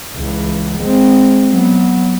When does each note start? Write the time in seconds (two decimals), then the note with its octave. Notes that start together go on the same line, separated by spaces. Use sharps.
0.15 C#2 E3
0.78 G#3 C4
1.51 F#3 B3